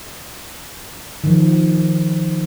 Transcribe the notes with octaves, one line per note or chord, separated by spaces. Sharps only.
D#3 F3